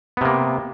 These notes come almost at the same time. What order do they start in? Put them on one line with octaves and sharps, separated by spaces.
B3 C3 A#3